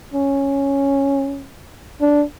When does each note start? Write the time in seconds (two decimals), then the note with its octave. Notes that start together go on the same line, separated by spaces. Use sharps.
0.14 C#4
2.01 D4